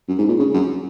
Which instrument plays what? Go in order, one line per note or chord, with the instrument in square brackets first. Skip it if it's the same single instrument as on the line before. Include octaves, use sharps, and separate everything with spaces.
[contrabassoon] F#2
G#2
A#2
C#3
F#2